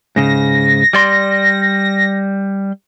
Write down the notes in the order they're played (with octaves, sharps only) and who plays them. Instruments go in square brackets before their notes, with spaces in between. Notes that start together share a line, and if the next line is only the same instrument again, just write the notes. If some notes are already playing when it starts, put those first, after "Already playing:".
[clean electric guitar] G#2 C#3 [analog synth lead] A#6
[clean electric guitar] G3 D5 C6